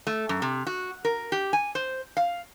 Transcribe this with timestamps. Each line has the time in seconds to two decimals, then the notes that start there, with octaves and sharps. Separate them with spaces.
0.07 A3
0.29 F#2
0.42 C3
0.67 F#4
1.05 A#4
1.32 G4
1.53 G#5
1.75 C5
2.17 F5